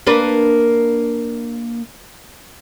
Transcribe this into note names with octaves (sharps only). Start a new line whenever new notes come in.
A#3 D4 B4